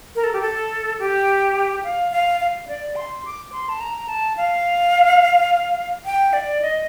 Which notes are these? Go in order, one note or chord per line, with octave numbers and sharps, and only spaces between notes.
A#4
A4
G4
A4
G4
F5
F5
F5
D5
C6
D6
C6
A5
A#5
A5
F5
G5
D5
D#5